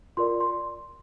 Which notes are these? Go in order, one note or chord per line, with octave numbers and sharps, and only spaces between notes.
F4 A#4 D5 C6
C6